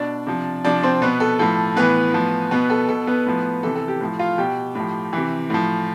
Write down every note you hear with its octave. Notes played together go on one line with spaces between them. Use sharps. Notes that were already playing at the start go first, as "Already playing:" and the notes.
Already playing: B2 D4 D5
C3 F3
C3 F3 D4 D5
C4 C5
B2 B3 B4
A4
A2 F3 A4
A2 E3 B3 B4
A2 F3
B2 B3 B4
A4
B2 A4
B3 B4
A2 F3
C3 E3 A4
A4
G4
A2 F3
F4 F5
B2 G4 G5
A2 F3
C3 E3
A2 F3